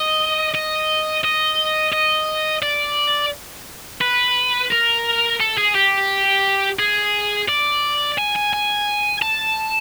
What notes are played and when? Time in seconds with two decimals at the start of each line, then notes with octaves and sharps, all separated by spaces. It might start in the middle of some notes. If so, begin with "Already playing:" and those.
Already playing: D#5
0.54 D#5
1.24 D#5
1.93 D#5
2.63 D5
4.01 B4
4.71 A#4
5.40 A4
5.58 G#4
5.75 G4
6.79 G#4
7.48 D5
8.18 G#5
8.35 G#5
8.53 G#5
9.22 A5